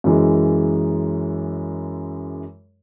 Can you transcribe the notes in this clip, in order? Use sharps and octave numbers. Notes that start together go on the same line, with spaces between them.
F#2 E3 G#3